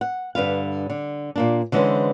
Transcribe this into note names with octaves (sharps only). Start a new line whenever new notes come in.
F#5
G2 D3 B4 F5
D3
A#2 A#3 D4
D3 E3 G#3 C#4 B4 C5